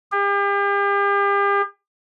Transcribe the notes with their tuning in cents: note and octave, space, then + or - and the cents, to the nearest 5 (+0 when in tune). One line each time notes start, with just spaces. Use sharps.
G4 +40